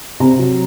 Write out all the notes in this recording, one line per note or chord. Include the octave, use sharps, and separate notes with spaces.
C3 A#5
F#3